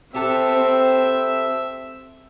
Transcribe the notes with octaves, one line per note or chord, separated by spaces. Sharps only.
C4 G4 A4 B4 E5